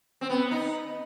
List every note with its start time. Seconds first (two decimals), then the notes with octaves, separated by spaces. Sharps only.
0.21 C4
0.30 B3
0.51 D#4